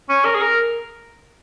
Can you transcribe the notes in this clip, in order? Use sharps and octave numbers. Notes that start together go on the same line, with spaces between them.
C#4
A#4
G#4
A#4